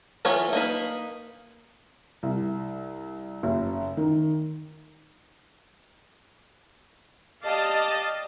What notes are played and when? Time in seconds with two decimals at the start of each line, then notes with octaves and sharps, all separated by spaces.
0.25 E3 A3 B3 F4 C#5
0.53 A#3 D#4 B4
2.23 C2
3.43 F#1
3.97 D#3
7.43 G4 D5 D#5 F5 A5